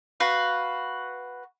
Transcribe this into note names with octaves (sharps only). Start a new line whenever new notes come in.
F#4 B4 F5